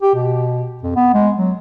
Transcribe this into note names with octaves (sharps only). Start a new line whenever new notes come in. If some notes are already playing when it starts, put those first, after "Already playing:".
G4
B2
F2
B3
G#3
F#3